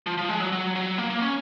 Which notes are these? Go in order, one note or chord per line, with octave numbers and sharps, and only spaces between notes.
F3
F3
G#3
F#3
F#3
F#3
A#3
A#3
C#4